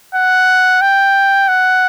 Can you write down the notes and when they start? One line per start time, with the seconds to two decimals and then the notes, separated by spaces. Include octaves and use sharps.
0.15 F#5
0.82 G5
1.49 F#5